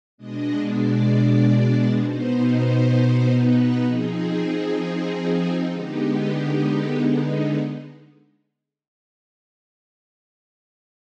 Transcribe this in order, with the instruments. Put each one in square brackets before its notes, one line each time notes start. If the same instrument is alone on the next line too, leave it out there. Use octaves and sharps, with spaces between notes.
[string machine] B2 G#3 D4 D#5
D5
B2 B3 D#4 C5
C5
B4
F3 C4 D#4 G#4
D3 G#3 B3 D#4 G4